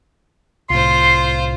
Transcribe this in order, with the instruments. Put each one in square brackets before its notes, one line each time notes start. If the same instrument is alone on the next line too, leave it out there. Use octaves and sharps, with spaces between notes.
[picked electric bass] C2 A2 [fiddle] F4 C5 [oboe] C6